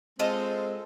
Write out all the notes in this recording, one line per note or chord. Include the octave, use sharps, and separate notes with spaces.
G#3 C4 F4 A4 D#5